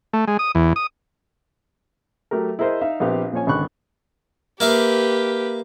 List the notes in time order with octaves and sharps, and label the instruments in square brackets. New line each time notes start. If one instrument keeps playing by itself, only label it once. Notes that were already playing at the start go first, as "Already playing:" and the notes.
[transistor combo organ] A3
G#3
D#6
E2
D#6
[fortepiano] F#3 A3 G4 A#4
E4 G#4 A#4 C5 D#5
D#4 E5 F5
A#1 B3 C4 G4 F5
A#2 F3 C#4 C#5 G#5
G#1 C#2 D3 B5 C#6 F#6
[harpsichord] A#3 E5 F5 [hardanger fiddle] G4 B4